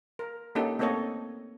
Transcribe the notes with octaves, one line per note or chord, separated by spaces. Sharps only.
A#4
A#3 C#4 D#4 G4 A4
A3 A#3 C4 A4 C#5 D#5